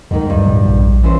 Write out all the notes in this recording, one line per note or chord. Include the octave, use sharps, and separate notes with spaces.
D2 G#2 D#3
G2
A2
A#1
E3 C#4 C5